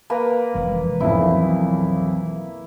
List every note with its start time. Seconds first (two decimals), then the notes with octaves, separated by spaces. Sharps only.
0.10 A#3 B4 A#5
0.55 F1 E3 G#3
1.00 B1 F2 E3 F#3 C4 E4